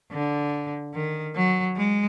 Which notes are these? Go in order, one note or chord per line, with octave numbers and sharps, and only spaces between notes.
D3
D#3
F#3
G#3